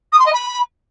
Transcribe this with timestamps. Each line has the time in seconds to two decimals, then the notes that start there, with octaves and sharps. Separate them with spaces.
0.12 D#6
0.19 C6
0.26 D#5
0.32 B5